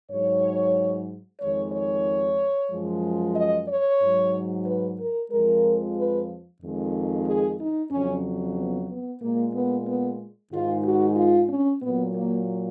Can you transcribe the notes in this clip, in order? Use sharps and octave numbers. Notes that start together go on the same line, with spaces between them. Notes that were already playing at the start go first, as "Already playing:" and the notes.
G#2 F#3 C#5
F2 D#3 G#3 C#5
C#5
F#2 F3 G#3
D#5
C#5
G#2 F#3
B4
A#4
F2 F3 G#3 A#4
B4
F2 D#3 G#3
G#4
D#4
F2 C#3 F#3 C#4
B3
B3
A#2 G#3 A#3
B3
B3
G#2 D#3 G#3 F4
F#4
F4
C#4
A#2 F#3 B3
A#3